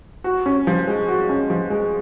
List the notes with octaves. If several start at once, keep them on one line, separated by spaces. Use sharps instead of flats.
F#4
C#4
F3
G#3
F#4
C#4
F3
G#3